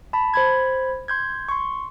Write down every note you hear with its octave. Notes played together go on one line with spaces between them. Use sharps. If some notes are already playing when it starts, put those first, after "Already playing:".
A5 B5
C5 B5 G#6
C6 G6 G#6
C6 C#6